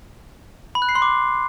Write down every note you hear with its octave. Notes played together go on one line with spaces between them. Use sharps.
B5
F#6
C7
C6
D6